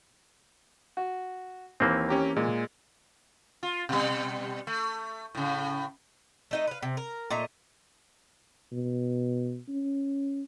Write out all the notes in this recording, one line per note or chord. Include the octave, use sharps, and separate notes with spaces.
F#4
D#2 E3 A#3 C4
C#4 G4 A#5
A#2 G#3
F4
B2 G3
A3
A2 C#3
A3 D#4 D#5
B4 F5
C3
A#4
A#2 A3 D#4 A#5
B2
C#4